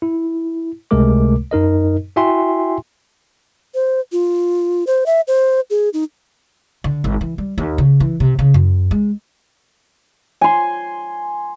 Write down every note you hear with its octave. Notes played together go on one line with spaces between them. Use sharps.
E4
C#2 C3 G#3 A3 A#4 D6
F#2 D#4 A#4 D#5
E4 F#4 E5 G5 G#5 C6
C5
F4
C5
E5
C5
G#4
D#4
D3
G#1
E3
G3
D#2
C#3
E3
C3
C#3
F#2
G#3
G#5 C6